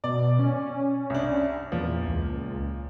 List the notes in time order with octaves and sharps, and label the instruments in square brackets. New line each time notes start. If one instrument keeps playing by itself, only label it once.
[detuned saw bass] B2 [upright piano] D5
[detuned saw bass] C#4
[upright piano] C2 D4
[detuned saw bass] E2 [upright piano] A#2 F3
[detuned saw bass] C#2